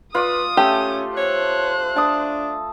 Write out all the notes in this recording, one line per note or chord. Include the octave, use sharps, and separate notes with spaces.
F4 B4 D5 D#6
A3 C#4 G4
C5 C#5 F#6
D4 A5 D#6